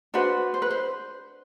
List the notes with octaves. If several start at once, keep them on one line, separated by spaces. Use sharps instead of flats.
D4 F#4 B4 C5
C5
B4
C5